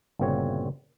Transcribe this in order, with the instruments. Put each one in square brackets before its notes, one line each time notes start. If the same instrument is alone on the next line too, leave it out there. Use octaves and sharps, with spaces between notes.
[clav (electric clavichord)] G1 A#2 C#3 C4 F#4 C#5